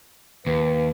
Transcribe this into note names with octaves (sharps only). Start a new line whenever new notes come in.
D#2 B4